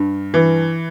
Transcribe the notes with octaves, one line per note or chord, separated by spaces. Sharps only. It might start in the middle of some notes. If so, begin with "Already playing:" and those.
Already playing: G2
E3